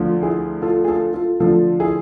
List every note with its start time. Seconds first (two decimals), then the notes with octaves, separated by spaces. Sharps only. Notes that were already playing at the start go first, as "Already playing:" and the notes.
Already playing: D2 D3 F3 F4
0.23 E4 G#4
0.62 F4 A4
0.84 G#4
0.88 F4 A4
1.14 F4 A4
1.40 D2 D3 F3 F4 A4
1.80 E4 G#4